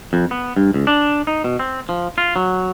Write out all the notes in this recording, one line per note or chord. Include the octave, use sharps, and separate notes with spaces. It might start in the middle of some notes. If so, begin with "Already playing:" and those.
F2
B3
G2
C#2
D4
D#4
B2
C4
F3
F4
F#3